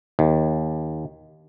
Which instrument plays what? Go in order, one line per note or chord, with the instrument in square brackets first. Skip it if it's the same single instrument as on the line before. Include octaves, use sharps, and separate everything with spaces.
[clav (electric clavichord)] D#2